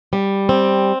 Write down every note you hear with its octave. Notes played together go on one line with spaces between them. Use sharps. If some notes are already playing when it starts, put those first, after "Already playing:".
G3
C4